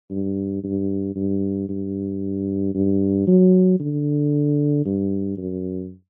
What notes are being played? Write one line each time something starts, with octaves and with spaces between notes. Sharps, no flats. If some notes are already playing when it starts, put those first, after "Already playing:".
G2
G2
G2
G2
G2
F#3
D3
G2
F#2